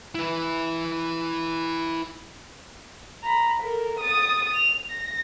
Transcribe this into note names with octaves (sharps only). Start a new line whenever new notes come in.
E4 B4
A#5 B5
A4 A#4
D#6 A6
F7
A#6